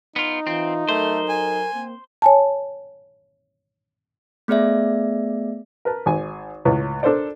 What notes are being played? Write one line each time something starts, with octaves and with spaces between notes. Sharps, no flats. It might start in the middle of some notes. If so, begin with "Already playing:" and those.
B3 D#4 F4
E3 C4 F4
F#3 A3 A4 A#4 C5
G#5
A#3 C4
C#5 G#5 A5
A3 B3 G#4 D5 E5
A#4 B4 A5
G#1 G#5
C#2 A2 B4
D4 A4 A#4 C5 D5